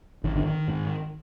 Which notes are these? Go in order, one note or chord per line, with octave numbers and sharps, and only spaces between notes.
G#1 D#3
D3
D#3
G#2